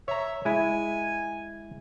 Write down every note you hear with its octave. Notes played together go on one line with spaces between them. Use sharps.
C#5 E5 A#5
G#3 E4 G#5